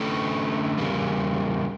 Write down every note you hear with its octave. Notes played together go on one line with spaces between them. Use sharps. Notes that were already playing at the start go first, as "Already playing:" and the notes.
Already playing: D3 A3 C#4
E2 C#3 G3 A#3